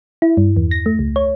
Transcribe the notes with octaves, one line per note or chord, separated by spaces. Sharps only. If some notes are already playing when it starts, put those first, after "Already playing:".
E4
G2
E2
A#6
A3
C#2
C#5